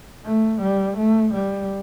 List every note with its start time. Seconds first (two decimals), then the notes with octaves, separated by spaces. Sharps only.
0.25 A3
0.62 G3
0.98 A3
1.34 G3